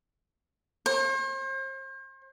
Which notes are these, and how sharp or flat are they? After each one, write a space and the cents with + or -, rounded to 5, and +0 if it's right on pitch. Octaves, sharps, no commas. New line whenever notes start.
C5 +40